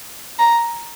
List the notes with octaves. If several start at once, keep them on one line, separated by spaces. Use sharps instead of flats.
A#5